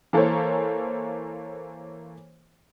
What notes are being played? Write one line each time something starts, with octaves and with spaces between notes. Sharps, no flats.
E3 A#3 A4 A#4 C5 C#5